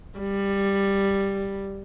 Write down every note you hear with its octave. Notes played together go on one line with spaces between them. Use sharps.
G3